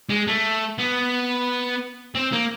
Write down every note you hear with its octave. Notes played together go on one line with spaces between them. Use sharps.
G#3
A3
B3
C4
A#3